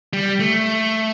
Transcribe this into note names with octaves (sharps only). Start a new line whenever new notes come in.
G3
A3